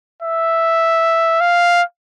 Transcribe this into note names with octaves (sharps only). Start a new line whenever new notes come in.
E5
F5